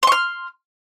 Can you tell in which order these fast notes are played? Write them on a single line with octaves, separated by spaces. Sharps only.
C6 C#6 F6